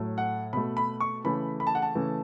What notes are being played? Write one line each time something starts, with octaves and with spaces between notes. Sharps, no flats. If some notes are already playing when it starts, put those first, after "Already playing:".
Already playing: A2 F#3 A3
F#5
B2 A3 B5
B5
C#6
C#3 E3 A3 B5
B5
A5
F#5
A5
C#3 E3 A3